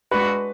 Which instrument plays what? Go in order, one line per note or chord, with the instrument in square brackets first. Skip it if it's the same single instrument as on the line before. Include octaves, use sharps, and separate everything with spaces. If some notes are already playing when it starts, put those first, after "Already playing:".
[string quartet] G#3 D4 F#4 [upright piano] B4